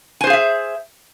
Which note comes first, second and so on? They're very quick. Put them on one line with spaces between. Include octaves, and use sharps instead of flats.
G#5 C5 G#4 F5 E5